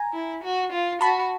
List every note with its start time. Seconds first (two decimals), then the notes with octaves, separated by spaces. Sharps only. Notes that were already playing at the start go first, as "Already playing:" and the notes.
Already playing: G#5 A#5
0.13 E4
0.43 F#4
0.72 F4
1.01 F#4 A5 B5